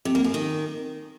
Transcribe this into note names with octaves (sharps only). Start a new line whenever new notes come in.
C3
A#3
F#2
D#3